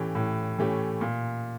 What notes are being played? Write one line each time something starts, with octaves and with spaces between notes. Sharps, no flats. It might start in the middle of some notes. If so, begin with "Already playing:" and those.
Already playing: A2 E3 A3 C#4 G4
A2
E3 A3 C#4 G4
A#2